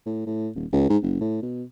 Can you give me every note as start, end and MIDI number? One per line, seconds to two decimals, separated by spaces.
0.06 0.23 45
0.27 0.49 45
0.56 0.66 27
0.73 0.87 37
0.89 0.97 44
1.02 1.17 30
1.21 1.38 45
1.43 1.63 47